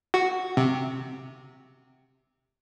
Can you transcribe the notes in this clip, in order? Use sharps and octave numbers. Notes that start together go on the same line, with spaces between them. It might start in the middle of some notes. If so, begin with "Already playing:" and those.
F#4
C3